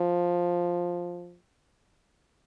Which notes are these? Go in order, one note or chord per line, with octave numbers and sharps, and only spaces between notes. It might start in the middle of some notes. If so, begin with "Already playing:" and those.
Already playing: F3